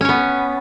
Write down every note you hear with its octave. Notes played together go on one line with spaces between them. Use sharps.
B3 C#4 C#5